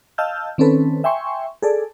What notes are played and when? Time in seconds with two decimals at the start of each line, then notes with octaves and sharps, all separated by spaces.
0.18 D#5 F5 A5 E6 F6 G6
0.58 D#3 C4 C#4 A4 B4
1.04 E5 G5 G#5 C6 C#6
1.62 G#4 A4 D5